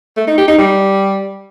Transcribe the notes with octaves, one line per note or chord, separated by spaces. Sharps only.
A3
D#4
G4
D#4
G3